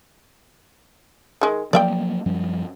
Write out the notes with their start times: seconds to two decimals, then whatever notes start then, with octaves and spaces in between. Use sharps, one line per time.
1.41 D#3 G#3
1.73 F3 F#3 A#3 D5 E5 G5
2.26 F#2 F3 G3